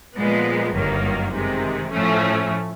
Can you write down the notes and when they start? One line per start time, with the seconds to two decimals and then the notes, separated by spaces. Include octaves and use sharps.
0.16 A#2 F3 G#3 B3
0.75 G1 F#2 D#3 F#3 A#3
1.33 C3 D#3 G#3
1.91 A2 F3 A3 C#4